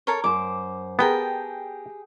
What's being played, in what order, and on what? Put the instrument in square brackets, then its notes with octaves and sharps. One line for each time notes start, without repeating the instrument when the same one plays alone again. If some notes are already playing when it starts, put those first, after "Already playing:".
[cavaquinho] A4 A#4 C#5
[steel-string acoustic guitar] F#2 C5 [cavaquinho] D6
[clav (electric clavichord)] B3 [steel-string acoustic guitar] G4 G#4 [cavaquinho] A#4 G5 A5